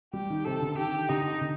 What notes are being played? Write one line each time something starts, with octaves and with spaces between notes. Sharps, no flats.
G3 G4
D#3
C3 A4
D3
D#3 G4
D3 D#4
D3